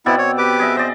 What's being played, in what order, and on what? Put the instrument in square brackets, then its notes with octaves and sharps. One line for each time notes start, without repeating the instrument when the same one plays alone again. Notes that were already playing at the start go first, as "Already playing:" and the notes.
[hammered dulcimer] B2 C4 D5 [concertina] B3 E4
[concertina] C#5
G4 B4 D6
[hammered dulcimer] G#4 D#5 E5
[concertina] C5 [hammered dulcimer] D5 D#5